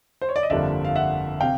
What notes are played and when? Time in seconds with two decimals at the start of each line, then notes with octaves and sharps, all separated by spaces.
0.21 C5
0.29 C#5
0.36 D5
0.43 D#5
0.50 G1 F2 D3 G3 A#3 D5 E5
0.85 F5
0.96 E5 F#5
1.41 C3 F5 G5